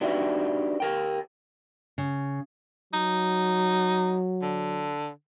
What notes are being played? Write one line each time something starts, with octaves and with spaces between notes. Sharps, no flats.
D4 D#4 F#4 G4 B4 E5
G4 A#4 G5
C#3
F#3 D#4
D3